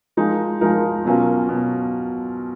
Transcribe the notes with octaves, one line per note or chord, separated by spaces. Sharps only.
F3 G#3 D#4 A#4
F3 G#3 D#4 A#4
B2 F#3 C#4 F4 A#4
B2